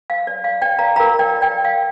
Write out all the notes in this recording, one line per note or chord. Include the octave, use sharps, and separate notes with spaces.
F5
D5
F5
D5 G5
F5 A#5
F4 A#4 F5 A#5
D5 G5
D5 G5
F5